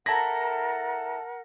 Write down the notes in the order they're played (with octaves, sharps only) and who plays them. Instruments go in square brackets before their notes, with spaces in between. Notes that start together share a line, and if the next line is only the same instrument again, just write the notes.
[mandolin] E4 A4 A#5 [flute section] A#4 F#5 [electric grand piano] A5 A#6